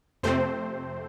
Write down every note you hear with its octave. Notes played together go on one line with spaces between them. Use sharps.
F2 C3 A3 C4 C5